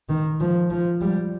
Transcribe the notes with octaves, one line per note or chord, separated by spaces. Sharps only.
D#3
F3
F3
G3